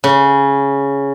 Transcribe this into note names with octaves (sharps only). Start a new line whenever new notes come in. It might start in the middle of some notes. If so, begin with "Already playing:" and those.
C#3